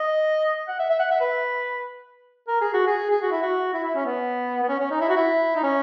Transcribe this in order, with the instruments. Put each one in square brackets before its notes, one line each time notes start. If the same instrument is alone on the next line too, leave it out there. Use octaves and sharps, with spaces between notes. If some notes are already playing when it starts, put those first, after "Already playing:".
Already playing: [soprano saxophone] D#5
F#5
E5
E5
F#5
E5
B4
A#4
G#4
F#4
G#4
G#4
F#4
E4
F#4
E4
E4
C#4
B3
B3
C#4
C#4
D#4
E4
F#4
E4
D#4
C#4